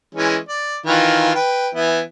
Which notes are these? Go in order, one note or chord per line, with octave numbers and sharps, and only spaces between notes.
E3 G#3 C#4
D5
D#3 E3 F4
B4 G5
E3 B3 E4